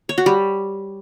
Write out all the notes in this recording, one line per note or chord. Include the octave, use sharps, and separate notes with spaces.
C#5
F#4
G3